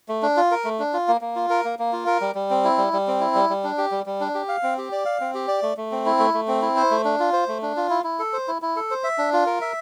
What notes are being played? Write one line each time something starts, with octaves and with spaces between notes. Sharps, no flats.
A3
D4
F4
A#4
A3
D4
F4
A#3
A#3
F4
A#4
A#3
A#3
F4
A#4
G3
G3
C4
E4
G3
G3
C4
E4
G3
G3
D4
G4
G3
G3
D4
G4
F5
C4
G4
D5
F5
C4
G4
D5
A3
A3
C4
E4
A3
A3
C4
E4
C5
A3
D4
F4
C5
A3
D4
F4
E4
E4
A4
C5
E4
E4
A4
C5
E5
D4
F4
A#4
E5